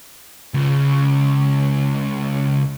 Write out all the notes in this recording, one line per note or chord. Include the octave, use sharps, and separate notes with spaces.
C#2 C#3